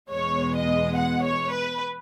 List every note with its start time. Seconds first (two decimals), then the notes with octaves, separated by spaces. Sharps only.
0.11 E2 B2 G#3 B3 C#5
0.54 D#5
0.95 F#5
1.23 C#5
1.52 B4